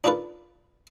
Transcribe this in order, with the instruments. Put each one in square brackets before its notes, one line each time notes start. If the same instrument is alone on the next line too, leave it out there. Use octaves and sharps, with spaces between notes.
[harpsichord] D4 D#4 F4 A4 B4